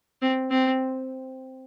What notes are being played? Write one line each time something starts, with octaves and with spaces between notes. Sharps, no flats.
C4
C4